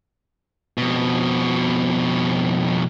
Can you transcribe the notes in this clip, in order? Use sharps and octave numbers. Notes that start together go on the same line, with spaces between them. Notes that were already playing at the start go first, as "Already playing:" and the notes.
F2 B2